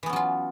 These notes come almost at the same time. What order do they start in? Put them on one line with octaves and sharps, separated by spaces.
E3 B3 C#4 F#3 F4